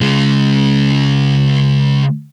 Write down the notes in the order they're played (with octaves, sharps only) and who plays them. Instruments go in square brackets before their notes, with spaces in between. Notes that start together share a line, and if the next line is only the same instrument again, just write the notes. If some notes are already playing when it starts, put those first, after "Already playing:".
[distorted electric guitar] C#3 G#3